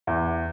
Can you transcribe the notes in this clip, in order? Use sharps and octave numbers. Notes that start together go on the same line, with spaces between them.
E2